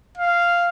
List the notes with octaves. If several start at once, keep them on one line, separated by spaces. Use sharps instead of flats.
F5